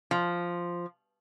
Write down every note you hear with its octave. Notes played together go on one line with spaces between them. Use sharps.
F3